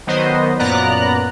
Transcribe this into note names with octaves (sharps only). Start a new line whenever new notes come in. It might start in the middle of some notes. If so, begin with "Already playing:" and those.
D#3 F#3 B3 C5 D#5
F#2 A#2 B3 D5 A#5 F#6